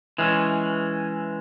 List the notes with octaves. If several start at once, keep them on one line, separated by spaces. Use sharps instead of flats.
E3 G#3 C#4